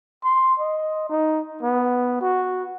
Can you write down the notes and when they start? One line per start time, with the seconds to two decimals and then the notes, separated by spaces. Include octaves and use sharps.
0.24 C6
0.59 D#5
1.09 D#4
1.63 B3
2.21 F#4